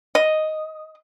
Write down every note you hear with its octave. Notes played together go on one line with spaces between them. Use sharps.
D#5